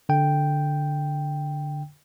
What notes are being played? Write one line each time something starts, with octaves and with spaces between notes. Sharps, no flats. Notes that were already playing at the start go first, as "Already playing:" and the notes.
D3 G5